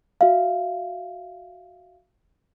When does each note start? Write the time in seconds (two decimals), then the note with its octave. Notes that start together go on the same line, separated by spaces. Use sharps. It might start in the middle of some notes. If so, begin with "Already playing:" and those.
0.21 F#4 E5 F5